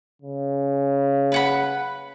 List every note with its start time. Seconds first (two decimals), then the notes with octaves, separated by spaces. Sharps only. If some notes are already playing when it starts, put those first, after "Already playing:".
0.22 C#3
1.32 B4 F#5 B5